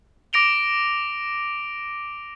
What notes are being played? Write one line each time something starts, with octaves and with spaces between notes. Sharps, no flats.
D6 A#6 D7 F7 G7